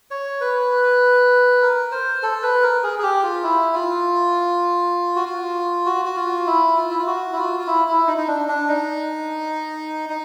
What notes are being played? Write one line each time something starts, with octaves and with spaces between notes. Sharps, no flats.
C#5
B4
A#4
C5
A4
B4
A#4
G#4
G#4
G4
F4
E4
F4
F#4
F4
F#4
F#4
F4
E4
F4
E4
F4
F#4
E4
F4
F4
E4
E4
D#4
D#4
D4
D4
D#4
D#4